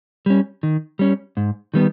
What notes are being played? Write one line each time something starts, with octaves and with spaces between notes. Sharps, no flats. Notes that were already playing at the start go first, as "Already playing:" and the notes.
G3 C#4
D#3
G3 C#4
G#2
D#3 G3 B3